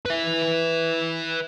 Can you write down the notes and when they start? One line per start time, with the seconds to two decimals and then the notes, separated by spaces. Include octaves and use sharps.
0.06 B4 E5